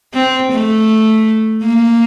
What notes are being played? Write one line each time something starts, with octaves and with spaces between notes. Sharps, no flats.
C4
A3
A#3